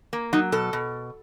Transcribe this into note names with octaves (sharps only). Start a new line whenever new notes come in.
A#3
F#3 D#4
B2 A4
B2